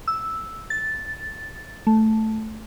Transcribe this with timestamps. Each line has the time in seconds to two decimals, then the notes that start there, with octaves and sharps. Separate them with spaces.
0.08 E6
0.70 A6
1.87 A3